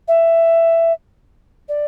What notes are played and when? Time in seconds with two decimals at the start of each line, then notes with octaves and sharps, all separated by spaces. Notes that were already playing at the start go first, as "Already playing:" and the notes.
0.08 E5
1.68 D5